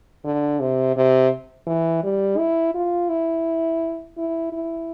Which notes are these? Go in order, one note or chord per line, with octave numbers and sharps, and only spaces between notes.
D3
C3
C3
E3
G3
E4
F4
E4
E4
E4